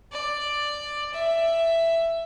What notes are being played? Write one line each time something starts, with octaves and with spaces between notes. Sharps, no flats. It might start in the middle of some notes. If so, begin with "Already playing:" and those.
D5
E5